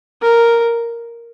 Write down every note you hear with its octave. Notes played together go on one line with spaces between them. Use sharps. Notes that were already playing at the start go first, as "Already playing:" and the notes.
A#4